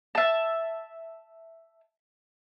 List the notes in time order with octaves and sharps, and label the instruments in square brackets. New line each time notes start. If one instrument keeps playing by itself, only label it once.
[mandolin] E5 A5